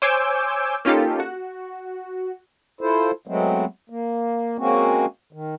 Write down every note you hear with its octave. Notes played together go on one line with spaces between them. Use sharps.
C5 C#5 G#5 D6 E6 G6
A#3 C#4 D#4 F4 G4 A4
F#4
E4 F4 A4 C5
F#3 G#3 A3 B3 C4
A#3
G#3 A#3 C4 C#4 F#4
D#3